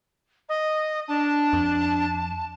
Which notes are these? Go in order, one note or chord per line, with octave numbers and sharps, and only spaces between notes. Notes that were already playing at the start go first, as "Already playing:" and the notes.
D#5
D4 A5
F2